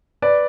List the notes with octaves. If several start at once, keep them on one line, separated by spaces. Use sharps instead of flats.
B4 D5